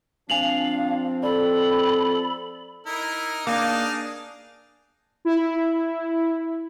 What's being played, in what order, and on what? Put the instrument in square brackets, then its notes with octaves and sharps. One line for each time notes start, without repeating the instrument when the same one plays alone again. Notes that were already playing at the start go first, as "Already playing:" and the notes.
[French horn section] F3 C4 [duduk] D4 [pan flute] F5 [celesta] G#5 F7 F#7
[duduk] A4 [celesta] D5 [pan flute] B5
[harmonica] D#4 A#4 [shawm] E4
[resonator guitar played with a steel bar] A#3 [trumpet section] D4 [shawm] D#4 [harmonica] G#4 F5 D6
[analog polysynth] E4